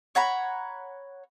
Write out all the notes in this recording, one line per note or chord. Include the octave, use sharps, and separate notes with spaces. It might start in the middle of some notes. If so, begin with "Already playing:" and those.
C#5 F#5 A#5 B5